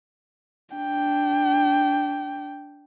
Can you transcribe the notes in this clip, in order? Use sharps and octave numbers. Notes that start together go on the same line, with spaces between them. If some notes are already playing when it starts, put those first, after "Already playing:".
D4 G5